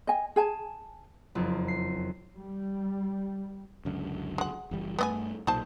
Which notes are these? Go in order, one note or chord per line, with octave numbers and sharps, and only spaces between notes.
D#5 G#5
G#4 G#5 A5
F#1 F2
C7
G3
C#2 F#2 D3
G#3 F#5
F#1 E3 G3
G2 A3 B3 D#5 G#5
B1 A#2 D#4 C5 A5